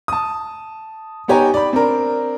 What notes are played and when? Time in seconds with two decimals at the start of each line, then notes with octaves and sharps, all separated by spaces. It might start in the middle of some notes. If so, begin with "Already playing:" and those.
0.08 A5 D#6
1.28 B3 D#4 G4 C#5 G#5 A#5
1.54 D5 B5
1.73 C4 D4 A#4